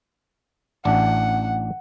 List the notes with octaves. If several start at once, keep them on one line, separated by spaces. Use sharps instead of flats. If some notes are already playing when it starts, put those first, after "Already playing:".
A1 D4 F#5